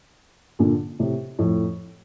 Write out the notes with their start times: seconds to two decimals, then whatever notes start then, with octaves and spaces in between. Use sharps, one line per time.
0.59 A#2 D3
0.99 A2 C3
1.39 F2 A2